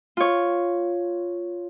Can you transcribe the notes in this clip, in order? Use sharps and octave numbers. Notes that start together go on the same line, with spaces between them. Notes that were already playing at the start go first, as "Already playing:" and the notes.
F4 C#5